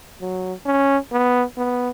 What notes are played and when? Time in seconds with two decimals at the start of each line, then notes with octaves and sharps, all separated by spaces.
0.21 F#3
0.66 C#4
1.12 B3
1.57 B3